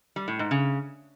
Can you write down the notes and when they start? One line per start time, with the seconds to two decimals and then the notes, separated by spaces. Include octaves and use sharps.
0.16 G3
0.28 A2
0.39 G#2
0.51 C#3